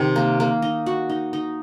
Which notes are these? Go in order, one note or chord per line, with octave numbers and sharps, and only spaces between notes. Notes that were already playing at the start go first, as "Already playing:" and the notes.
Already playing: C3 D#3
A#3
A#3
D#4
F#4
D#4
D#4